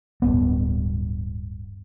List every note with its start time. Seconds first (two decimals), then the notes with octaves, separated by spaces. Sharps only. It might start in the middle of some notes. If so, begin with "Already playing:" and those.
0.22 D1 G#1 G2 B3